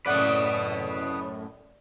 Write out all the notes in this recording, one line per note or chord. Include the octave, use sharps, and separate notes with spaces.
F#2 A2 C#3 A3 B4 D5 D#5 F#5